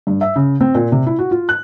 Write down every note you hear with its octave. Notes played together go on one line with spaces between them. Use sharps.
G2
E5
C#3
C4
A#2
C3
E4
F#4
F4
F#6